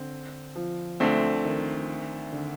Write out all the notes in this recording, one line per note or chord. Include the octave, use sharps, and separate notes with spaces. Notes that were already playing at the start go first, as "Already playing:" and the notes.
Already playing: D3 C4
F3
D2 D3 A3 C4
D#3
D3